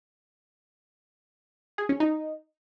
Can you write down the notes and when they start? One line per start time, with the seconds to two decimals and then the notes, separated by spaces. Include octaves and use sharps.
1.78 G#4
1.89 C#4
2.00 D#4